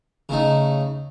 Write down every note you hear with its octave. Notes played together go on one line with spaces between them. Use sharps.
C#3 A3 D#4